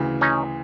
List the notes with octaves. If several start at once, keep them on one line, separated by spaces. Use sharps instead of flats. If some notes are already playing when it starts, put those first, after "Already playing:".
Already playing: D2 C#3 E3
C#4 D#4